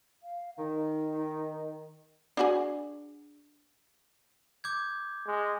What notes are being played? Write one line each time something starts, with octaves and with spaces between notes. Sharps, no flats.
F5
D#3 D#4
D4 F#4 G#4
D6 G6 G#6
G#3